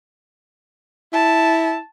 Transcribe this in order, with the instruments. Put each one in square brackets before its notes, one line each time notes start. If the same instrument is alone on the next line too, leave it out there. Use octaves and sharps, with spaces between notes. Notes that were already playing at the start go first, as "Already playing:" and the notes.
[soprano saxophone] E4 [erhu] A5